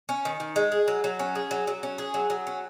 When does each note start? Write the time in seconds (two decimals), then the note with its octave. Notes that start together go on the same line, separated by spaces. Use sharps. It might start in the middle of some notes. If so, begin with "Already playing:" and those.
0.09 C#4
0.25 D#3
0.40 D#3
0.56 G#3
0.72 G#4
0.88 F#3
1.04 F#3
1.19 C#4
1.35 G#4
1.51 F#3
1.67 F#3
1.83 C#4
1.98 G#4
2.14 F#3
2.30 F#3
2.47 C#4